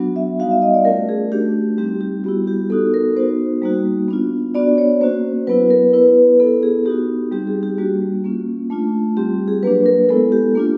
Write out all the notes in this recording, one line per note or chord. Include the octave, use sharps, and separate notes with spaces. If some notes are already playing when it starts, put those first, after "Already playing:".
Already playing: F#3 B3 D4 F#4
E5
G3 B3 D#4 F#4 F5
E5
D#5
D5
A3 C#4 F4 A#4
G#4
A3 D4 F#4 G4
G3 C4 D#4 G4
G4
G3 B3 E4 F#4
G4
B3 D#4 F#4 A4
A#4
B3 D#4 F#4 C5
G3 A#3 D#4 F#4
B3 D4 F4
B3 D4 F#4 D5
C#5
A#3 C#4 F#4 C5
F#3 B3 E4 B4
A#4
B3 E4 B4
B3 E4 A4
G#4
B3 D#4 F#4 G4
G3 C4 D#4 G4
G#4
G4
G3 A#3 D4 F#4
A#3 C#4 F4
A3 D4 F4
G3 C4 F4 G4
G#4
F#3 A#3 D4 B4
A#4
G#3 B3 E4 A4
G4
A#3 D4 F4